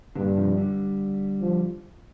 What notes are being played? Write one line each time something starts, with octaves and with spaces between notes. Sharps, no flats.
G2 A#2 D3
C3 F3
D3 G3
F3